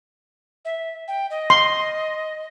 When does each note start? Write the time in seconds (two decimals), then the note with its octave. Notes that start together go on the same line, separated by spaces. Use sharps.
0.65 E5
1.08 G5
1.30 D#5
1.50 C6